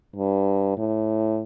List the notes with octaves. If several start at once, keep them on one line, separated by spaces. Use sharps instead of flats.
G2
A2